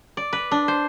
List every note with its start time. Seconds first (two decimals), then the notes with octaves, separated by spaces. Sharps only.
0.17 D5
0.33 B4
0.51 D4
0.68 C5